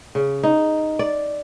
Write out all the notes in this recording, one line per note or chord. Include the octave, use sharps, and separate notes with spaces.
C#3
D#4
D5